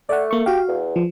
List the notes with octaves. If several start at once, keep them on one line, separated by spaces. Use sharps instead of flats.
A3 D5 F#5
A#3 C#6
F#4 G4 F5
E2
F3